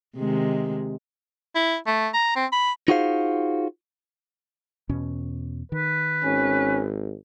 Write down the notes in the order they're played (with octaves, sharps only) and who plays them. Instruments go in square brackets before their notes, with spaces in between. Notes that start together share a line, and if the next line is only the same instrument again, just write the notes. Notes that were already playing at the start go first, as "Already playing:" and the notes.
[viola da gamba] C3 D#3 G#3
[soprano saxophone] E4
A3
A#5
C4
B5
[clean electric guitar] D#4 F4 F#4 G#4 C5 F5
[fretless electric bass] E2 B2 C#4
[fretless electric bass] D#3 [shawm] B4
[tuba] G#1 [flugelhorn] C#4